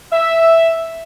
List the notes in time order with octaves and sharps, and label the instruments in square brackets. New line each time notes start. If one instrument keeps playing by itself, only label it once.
[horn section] E5